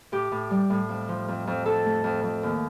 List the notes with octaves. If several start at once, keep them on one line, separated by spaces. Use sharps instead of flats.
A2 G4
A2
G3
A2
F2
F3
F2
F2
F2 A4
A3
F2
F2
D#2